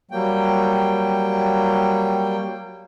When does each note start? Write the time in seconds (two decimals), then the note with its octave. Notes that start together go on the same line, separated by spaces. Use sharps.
0.11 F#3 G3 A#3 G5